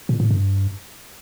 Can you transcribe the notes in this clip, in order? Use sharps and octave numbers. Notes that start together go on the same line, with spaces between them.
A#2
A2
G2